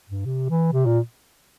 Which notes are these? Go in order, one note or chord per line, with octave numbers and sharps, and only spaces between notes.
G2
C3
E3
C3
A#2